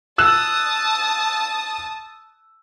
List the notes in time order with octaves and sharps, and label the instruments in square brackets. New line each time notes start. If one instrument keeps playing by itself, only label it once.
[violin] A5 D#6 [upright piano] E6 F#6 E7